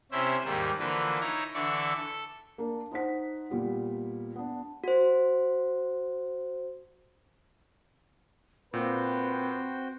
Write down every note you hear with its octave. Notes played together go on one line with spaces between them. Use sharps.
C3 C#4 E4 C5 E5
D#2 G#2 G3 A#3
D3 E3 F3 A#3 B4
D#4 E4 C#5 A#5
D3 E3 D5 E5 C#6
A4
A#3 D4 A#4
D#4 C5 F#5 B6
A#2 G3 B3
B3 D4
F#4 C5
A#2 C4 F#4 B4 C5 G5